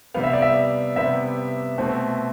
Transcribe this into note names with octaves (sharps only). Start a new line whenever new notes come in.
C3 G3 B3 F5
E5
D5
E5
C3 G3 B3 E5
B2 A3 C4